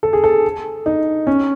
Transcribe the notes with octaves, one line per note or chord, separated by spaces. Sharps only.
A4
G#4
A4
D#4
C#4